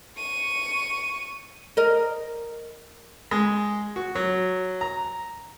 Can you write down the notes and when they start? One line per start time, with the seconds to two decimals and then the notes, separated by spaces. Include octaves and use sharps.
0.17 C#6 D#7
1.77 A#4 D#5
3.31 G#3
3.96 F#4
4.15 F#3
4.81 A#5